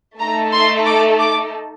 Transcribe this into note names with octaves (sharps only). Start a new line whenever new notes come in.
A3 D#4 A4 A#5
C6
D6
D6